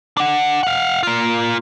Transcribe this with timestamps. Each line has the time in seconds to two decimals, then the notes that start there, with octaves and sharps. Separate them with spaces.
0.17 D4 F#5
0.63 F5 F#5
1.03 A#3 F4